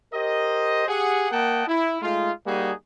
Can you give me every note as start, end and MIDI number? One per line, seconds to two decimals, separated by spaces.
0.14 0.84 67
0.14 0.84 70
0.14 0.84 72
0.14 0.84 75
0.88 1.27 67
0.88 1.27 68
0.88 1.27 78
1.31 1.64 58
1.31 1.64 70
1.31 1.64 75
1.31 1.64 78
1.31 1.64 79
1.31 1.64 81
1.68 1.97 64
2.02 2.30 56
2.02 2.30 57
2.02 2.30 63
2.02 2.30 65
2.46 2.73 55
2.46 2.73 58
2.46 2.73 63
2.46 2.73 66
2.46 2.73 68